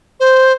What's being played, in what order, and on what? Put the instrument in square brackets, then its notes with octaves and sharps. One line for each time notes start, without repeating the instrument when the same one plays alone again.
[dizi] C5